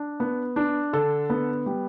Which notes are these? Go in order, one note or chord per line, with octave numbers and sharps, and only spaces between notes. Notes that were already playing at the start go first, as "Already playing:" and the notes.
Already playing: D4
B3
D4
D3 A4
B3
G3